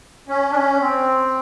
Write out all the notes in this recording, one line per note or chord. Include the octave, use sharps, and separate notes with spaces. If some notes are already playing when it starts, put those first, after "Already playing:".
C#4
D4
C#4
C4